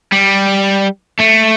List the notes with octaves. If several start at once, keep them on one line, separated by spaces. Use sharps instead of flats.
G3
A3